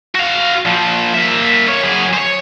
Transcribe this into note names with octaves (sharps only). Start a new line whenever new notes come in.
F#4 F5
A#2 F3
A#3 E5
F2 C#5
F#2 G#4
C5 C#5